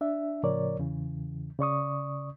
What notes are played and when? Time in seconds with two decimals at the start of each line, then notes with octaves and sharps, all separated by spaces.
0.01 D4 E5
0.43 A2 C#3 F3 A#4 C#5 D5
0.78 E2 C#3 E3
1.59 C#3 D5 C#6 D#6